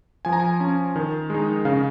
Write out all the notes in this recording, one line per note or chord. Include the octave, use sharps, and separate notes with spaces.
F3 G#5
A#5
G#5
C#4
D#3
G#3 D#4
C#3 F5